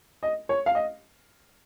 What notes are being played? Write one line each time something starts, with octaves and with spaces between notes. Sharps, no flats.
D#5
C#5
F5
D#5